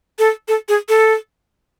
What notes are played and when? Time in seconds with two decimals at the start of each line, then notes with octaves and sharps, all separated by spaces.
0.19 A4
0.48 A4
0.68 G#4
0.89 A4